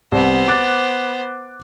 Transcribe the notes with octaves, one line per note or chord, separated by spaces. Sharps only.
C2 B3 C5
D6 F#6 A6